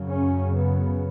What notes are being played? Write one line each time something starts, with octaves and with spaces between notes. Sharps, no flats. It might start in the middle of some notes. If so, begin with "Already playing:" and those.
Already playing: F#2 C#3
C#4
B3